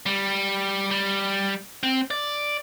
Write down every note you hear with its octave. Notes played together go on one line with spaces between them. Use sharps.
G3
G3
C4
D5